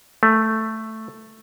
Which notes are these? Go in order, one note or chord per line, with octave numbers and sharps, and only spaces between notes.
A3